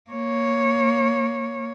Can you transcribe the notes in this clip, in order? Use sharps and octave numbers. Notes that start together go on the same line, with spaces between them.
A#3 C#5